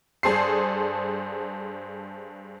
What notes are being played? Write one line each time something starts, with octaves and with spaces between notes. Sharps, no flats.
G2 G#4 A4 C5 C7